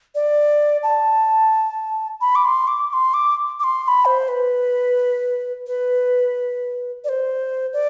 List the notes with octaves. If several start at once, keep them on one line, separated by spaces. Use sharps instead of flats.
D5
A5
B5
D6
C6
D6
D6
C6
D6
D6
C6
C6
B5
C5
B4
B4
D5
C5
D5